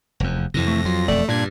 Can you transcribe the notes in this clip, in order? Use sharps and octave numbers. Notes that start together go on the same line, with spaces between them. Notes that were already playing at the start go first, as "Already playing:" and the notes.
F1 E2
F2 C3 E3 A#6
A3
F#3 F4
E1 F2 A3 D5
G2 A#2 D4 G#6